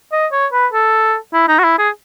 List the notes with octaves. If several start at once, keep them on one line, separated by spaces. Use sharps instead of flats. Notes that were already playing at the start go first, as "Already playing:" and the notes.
D#5
C#5
B4
A4
E4
D#4
F#4
E4
G#4